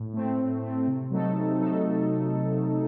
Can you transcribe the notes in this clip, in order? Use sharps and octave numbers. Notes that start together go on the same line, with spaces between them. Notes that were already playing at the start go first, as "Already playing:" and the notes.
Already playing: A2
A3 C4
A2
A3 C4
C3
F#3 A3 D#4 A4
C3
F#3 A3 D#4 A4